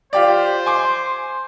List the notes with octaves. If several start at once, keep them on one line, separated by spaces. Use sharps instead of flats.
F4 G4 C5 D5
G#5 C6 D6